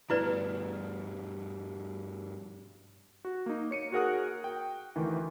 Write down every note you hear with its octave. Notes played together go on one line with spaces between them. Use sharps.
G2 B2 E4 B4 D5
F#4
A#3 D#4
C#5 C#7 D#7
F#4 G#4 A#4 F#5 D#6 F#6
G5
D2 D#3 E3